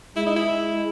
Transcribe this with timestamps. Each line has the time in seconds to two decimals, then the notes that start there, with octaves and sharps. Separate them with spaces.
0.16 G#3 E4
0.26 D#4
0.36 E4